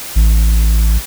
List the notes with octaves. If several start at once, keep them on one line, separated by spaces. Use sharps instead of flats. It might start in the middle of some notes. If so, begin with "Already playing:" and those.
A1